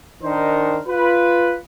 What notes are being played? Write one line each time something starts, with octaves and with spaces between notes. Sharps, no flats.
D#3 D4 D#4 A#4 C5
F4 B4